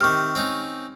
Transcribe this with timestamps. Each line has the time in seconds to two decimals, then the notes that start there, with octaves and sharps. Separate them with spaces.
0.01 C3 D#3 C#6 F6
0.35 C4 C#4 D#4